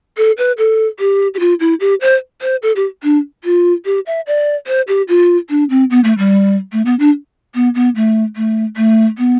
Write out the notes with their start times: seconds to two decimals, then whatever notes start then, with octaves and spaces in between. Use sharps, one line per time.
0.17 A4
0.38 B4
0.58 A4
0.99 G4
1.34 G4
1.40 F4
1.60 E4
1.80 G4
2.01 C5
2.42 C5
2.63 A4
2.76 G4
3.03 D4
3.44 F4
3.85 G4
4.06 E5
4.27 D5
4.67 C5
4.88 G4
5.09 F4
5.50 D4
5.70 C4
5.90 B3
6.04 A3
6.18 G3
6.72 A3
6.86 B3
6.99 D4
7.55 B3
7.75 B3
7.95 A3
8.36 A3
8.77 A3
9.18 B3